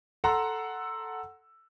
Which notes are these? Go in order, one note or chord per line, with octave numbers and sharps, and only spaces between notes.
A4 F#5 A#5 C6 E6